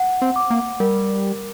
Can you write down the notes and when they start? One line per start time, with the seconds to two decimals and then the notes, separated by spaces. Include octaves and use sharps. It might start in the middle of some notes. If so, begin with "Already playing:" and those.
Already playing: F#5
0.22 C4
0.36 D6
0.50 A#3
0.80 G3 A#4